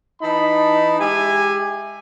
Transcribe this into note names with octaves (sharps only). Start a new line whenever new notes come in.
E3 D#4 A5 B5
G#3 G4 E5 G#5